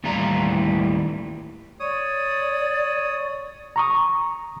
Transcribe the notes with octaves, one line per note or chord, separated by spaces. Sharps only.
D#2 A2 E3 G3 F4 A#5
C#5 D5 D#6
A#5 C#6 D#6